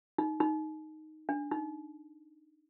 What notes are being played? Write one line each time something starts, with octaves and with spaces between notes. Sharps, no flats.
D#4
D#4
D4
D#4